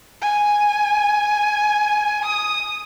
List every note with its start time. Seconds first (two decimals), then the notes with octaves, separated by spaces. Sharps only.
0.22 G#5
2.24 D#6